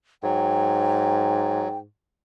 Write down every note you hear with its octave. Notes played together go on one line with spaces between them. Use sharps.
G#2 F#3 G5